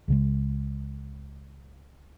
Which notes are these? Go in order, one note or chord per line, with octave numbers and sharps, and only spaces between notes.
C#2 C#3 G#3